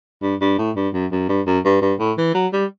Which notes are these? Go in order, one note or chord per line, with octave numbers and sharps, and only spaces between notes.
G2
G2
A2
G2
F#2
F#2
G2
F#2
G2
G2
A2
E3
F#3
G3